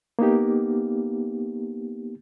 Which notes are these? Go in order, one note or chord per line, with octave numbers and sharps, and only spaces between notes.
A#3 B3 D#4 G4